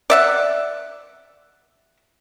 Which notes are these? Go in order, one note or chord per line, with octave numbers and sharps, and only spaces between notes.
D5 E5 F#5